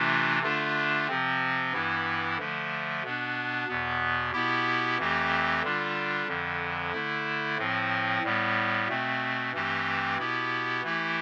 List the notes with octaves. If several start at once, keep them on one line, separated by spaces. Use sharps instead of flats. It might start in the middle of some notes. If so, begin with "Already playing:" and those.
Already playing: C3 E3 A3 D4 F4
D3 A3 D4 F4
C3 F3 C4
G2 E3 B3 E4
D3 F3 A3
B2 B3 D4
E2 B2 B3
B2 B3 E4 G4
F2 E3 A3 C4 G4
D3 G3 D4 F4
F2 D3 F3
D3 A3 E4
A2 F3 C4
A2 G3 B3
B2 A3 C4
G2 E3 A3 C4 G4
B2 B3 E4 G4
E3 A3 E4 G4